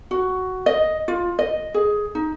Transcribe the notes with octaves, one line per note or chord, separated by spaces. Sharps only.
F#4
D#5
F4
D#5
G#4
D#4